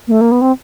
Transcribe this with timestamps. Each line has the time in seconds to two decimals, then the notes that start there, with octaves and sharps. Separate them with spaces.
0.08 A#3
0.11 A3
0.21 A#3
0.32 B3
0.41 C4